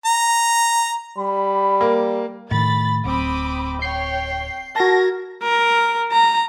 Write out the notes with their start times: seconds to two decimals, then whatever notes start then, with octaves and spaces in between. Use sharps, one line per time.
0.06 A#5
1.18 G3 B5
1.81 A#3
2.51 A2 D#3 B5 A6
3.05 D1 C4 B5 D6 D#6
3.82 C#5 G5 C7
4.76 F#4 A#4 A5 G#6 A#6
5.43 A#4
6.12 A#5